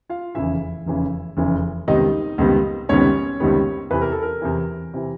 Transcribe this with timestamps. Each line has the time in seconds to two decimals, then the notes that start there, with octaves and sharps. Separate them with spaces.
0.10 F4 F5
0.35 F1 E2 C#3 E3 E4 E5
0.86 F1 E2 C#3 E3
1.37 F1 E2 C#3 E3
1.88 C#2 C3 D#3 G3 B3 D#4 D#5
2.38 C#2 C3 D#3 G3 B3
2.89 C#2 C3 D#3 G3 B3 C#4 C#5
3.40 C#2 C3 D#3 G3 B3
3.91 E2 C3 E3 B4
4.02 A#4
4.12 A4
4.22 A#4
4.42 E2 C3 E3
4.94 C3 E3